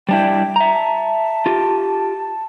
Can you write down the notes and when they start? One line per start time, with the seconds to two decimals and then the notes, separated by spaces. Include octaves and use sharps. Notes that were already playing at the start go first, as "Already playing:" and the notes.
0.09 G3 D4 E4 G5
0.56 E5 A#5
0.73 A5
1.46 F4 G4